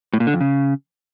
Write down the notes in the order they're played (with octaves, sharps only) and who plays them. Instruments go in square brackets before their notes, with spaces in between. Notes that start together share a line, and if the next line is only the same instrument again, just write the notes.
[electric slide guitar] A2
A#2
D3
F2
C#3